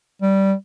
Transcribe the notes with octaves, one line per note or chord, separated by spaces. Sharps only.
G3